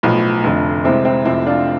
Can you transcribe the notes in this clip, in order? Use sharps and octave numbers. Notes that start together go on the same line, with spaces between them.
B1 A2 F3
F1 F2 D3 F3
C2 C3 G#3 C4 E4
C4 E4
F1 F2 C3 C4 E4
D4 F4